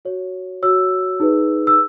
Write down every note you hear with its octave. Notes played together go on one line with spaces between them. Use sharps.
F#4 C#5
F#4 C#5 E6
D#4 G#4 B4
E6